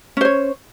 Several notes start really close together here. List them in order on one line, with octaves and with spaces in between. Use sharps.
C#4 C5 C#5